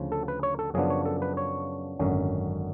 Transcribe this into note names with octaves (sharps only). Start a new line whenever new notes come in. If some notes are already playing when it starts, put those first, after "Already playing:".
Already playing: D2 C#3 F3
A4
B4
C#5
A4
F#2 C#3 F3 B3 D4 G#4
C#5
A4
B4
C#5
G#1 F#2 D3 F#3 C#4